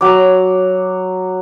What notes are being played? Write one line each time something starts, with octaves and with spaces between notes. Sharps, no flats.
F#3 D6